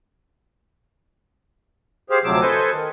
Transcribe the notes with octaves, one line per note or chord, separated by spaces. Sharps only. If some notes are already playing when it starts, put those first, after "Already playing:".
G4 G#4 C5 F5
D2 C3 F3 F#3 D6 E6
A4 B4 C5 D#5 G#5
D#3